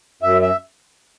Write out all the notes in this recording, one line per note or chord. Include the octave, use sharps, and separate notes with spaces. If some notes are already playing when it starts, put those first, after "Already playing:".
F#2 E5
E5